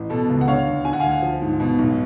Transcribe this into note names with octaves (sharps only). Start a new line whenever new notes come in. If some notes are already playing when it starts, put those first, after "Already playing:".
Already playing: A1
B2 A4
C#2
F#5
D3 C#5 F5
D2
D3 G#5
F#5
D2 F5 G#5
F3
G#2
B2
B1